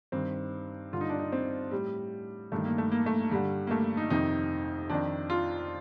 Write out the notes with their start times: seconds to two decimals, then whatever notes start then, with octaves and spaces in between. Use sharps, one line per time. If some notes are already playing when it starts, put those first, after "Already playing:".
0.12 G2 D#3 C4
0.93 G2 D3 F4
1.01 D#4
1.10 D4
1.19 D#4
1.32 C4
1.71 A2 G3
2.52 G2 D#3 A3
2.65 A#3
2.78 A3
2.91 A#3
3.06 A3
3.31 G2 D3 G3
3.67 A#3
3.71 A3
3.97 D#4
4.10 F2 C3 D#3 D#4
4.90 F2 D#3 D4
5.30 F4